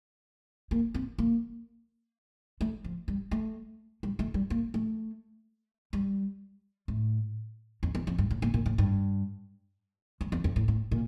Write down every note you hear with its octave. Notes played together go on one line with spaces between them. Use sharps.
A#3
C4
A#3
A3
F3
G3
A3
G3
A3
G3
A#3
A3
G3
A2
F2
E2
F2
G2
A2
A#2
A#2
A2
G2
G2
E2
F2
A2
A2
A#2